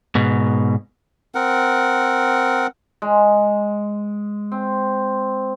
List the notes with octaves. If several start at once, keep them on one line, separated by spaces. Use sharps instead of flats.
G#2 B2
C4 A#4 F#5
G#3
C4